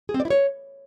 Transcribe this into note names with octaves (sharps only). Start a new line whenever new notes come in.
G#4
C4
D5
E4
C#5